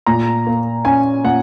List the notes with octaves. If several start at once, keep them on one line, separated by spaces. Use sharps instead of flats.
A#2 A#5
A#3
C#4 G#5
A#2 F#5